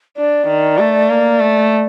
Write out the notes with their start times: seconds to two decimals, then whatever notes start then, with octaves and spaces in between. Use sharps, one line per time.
0.17 D4 D5
0.47 D#3
0.79 A3
1.10 A#3
1.40 A3